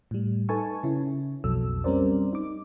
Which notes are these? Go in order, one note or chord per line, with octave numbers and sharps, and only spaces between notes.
A2 G3
D#4 A4 B4 G#5 A5 C#6
C#3 C#4 E4
B1 F2 B2 F#3 A4 E6
G3 C4 C#4 A#4 C5 D5
D#4 D6